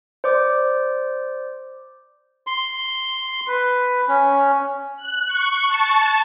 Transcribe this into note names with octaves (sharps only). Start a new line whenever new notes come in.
C5 D5 D6
C6
B4
C#4
F#6
C#6
A5